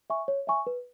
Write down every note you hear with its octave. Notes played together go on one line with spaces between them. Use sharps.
E5 G#5 C#6
C#5
E5 G#5 C#6
B4